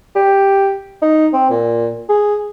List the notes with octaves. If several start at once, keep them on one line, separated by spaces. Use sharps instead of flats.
G4
D#4
C4
A#2
G#4